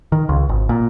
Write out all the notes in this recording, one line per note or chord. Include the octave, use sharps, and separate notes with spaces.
D#3
C#2
G#1
A#2